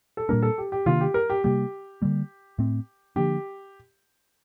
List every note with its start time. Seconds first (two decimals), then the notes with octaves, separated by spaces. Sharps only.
0.17 A4
0.29 A#2 G3 A#3 D4 A#4
0.42 A4
0.58 G4
0.72 G4
0.86 C3 D#3 A#3 D4 F4
1.01 G4
1.14 A#4
1.30 G4
1.44 C3 G3 A#3 G4
2.02 D3 G3 A#3
2.58 A2 A3 C4
3.16 D3 F3 A#3 D4 G4